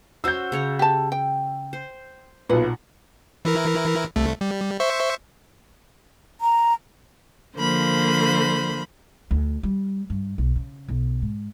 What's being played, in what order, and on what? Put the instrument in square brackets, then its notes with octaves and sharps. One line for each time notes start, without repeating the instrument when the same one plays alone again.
[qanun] C#4 F#4 C5 [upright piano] E6 G6
[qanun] C#3 C#5 A#5
[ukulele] G4 A5
G5
[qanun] C5
[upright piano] B1 A#2 [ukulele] B4 [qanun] F#5
[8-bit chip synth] E3 E4 A#4
C2 A3
G3
C5 E5 C#6
[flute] A#5
[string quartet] D3 F3 A#3 C5 B5
[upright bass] D2
G3
G2
B1
C#3
B1
G#2